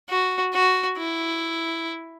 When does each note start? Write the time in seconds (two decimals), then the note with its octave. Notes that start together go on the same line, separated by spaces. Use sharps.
0.09 F#4
0.54 F#4
0.97 E4